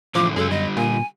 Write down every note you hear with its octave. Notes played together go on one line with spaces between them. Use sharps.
A2 D3 E3 F3 D6
F#2 C#3 G#3 G#4 A4
D3 G3 D#5
A#2 G#5